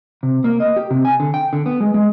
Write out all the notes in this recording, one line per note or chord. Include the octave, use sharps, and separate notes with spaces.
C3
A#3
D#5
G4
C3
G#5
D3
G5
D3
B3
G#3
G#3